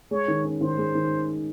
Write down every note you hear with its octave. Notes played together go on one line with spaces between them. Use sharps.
G#3 C#5
D#3
C#4
D#3 C5
G#3
D#3